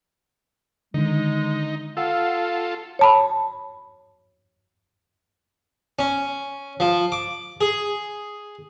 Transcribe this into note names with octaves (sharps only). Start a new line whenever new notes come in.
D3 D#3 G#3 D#4
F4 A4 F5 F#5 E6
C#5 A5 B5
C#4
F3
D6
G#4